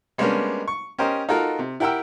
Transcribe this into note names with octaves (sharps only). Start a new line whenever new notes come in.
G3 G#3 A#3 B3 C#4 D4
C#6
C#4 G4 A#4 C5 D#5
D#4 F4 F#4 A4 A#4
C3
E4 G4 A#4 F#5 G5 E6